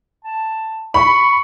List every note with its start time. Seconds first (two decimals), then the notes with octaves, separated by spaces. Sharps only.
0.25 A5
0.94 B5 C#6